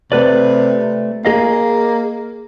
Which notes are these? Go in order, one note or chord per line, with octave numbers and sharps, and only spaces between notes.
C3 A3 B4 D5
A#3 G#4 D#5 F5